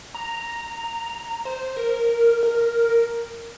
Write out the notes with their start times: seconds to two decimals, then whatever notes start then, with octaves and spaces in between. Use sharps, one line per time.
0.15 A#5
1.45 C5
1.77 A#4
2.43 A#4